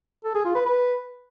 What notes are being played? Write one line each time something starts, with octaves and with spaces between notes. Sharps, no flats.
A4
G#4
F4
B4
B4